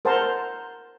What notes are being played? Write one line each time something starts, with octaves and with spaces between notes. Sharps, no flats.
A#4 C5 F#5 A5 A#5 C6